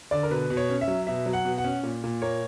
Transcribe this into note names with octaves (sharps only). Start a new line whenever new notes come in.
D3 D5
A#4
B2 B4
B2
C#5
C#4
E5
F#3
B2 E5
F#3
F#5
B2
F#5
C#4
A#2
A#2
A#3 C#5